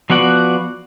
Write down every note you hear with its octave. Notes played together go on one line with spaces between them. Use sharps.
F3 B3 F#4 D5 F#5